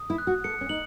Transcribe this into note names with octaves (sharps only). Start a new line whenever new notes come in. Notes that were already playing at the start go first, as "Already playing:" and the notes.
Already playing: D#6
E4
F#6
F#4
A4 C#7
C#4
D#4 F#7